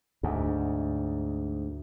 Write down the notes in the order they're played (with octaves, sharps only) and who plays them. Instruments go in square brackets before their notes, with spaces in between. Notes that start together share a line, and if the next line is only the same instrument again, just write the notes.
[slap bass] D2 G#2